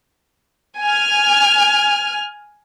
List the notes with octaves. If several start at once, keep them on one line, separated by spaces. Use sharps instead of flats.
G#5 F6